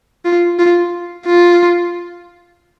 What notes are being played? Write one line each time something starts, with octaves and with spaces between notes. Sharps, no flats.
F4
F4
F4